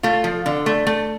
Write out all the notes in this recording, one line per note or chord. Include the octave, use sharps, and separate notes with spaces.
A3 F4
F3
D3
A3
A3